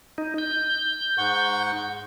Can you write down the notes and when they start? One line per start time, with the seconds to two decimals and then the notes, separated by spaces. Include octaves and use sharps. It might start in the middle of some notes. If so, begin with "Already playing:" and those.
0.18 D#4
0.38 G6
1.18 G#2 F#5 C#6